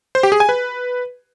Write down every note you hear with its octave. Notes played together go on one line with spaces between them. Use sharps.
C5
G4
G#4
G#5
B4